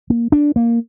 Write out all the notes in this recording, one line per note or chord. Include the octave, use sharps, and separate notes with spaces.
A#3
D4
A#3